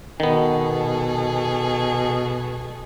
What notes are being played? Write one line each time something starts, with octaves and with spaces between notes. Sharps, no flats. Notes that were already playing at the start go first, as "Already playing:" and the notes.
B2 D#3 B3 G#4 A4